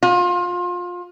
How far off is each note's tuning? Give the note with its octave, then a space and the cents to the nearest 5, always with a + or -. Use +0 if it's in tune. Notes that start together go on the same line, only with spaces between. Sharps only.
F4 +25